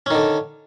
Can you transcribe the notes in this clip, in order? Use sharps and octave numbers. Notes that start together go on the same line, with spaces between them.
D3 D#3 C#4